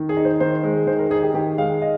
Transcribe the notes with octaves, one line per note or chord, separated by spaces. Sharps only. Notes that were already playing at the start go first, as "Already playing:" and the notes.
Already playing: D#3
G#4
D#4
C5
D#3 C5
G#3
D#3 C5
A#4
D#4 G#4
G4
D#3 G4
G#3 F5
D#5